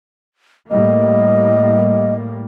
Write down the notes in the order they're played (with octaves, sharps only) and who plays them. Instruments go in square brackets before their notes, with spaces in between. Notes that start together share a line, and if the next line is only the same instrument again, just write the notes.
[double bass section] A2 G3 A#3 [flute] D#5